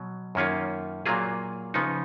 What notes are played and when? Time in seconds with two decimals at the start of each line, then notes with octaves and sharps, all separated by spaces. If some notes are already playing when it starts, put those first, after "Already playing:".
Already playing: B2 F#3
0.35 F#2 D#3 A#3 C#4 F4
1.06 A#2 F#3 A#3 F4 G#4
1.74 C#3 F3 B3 D#4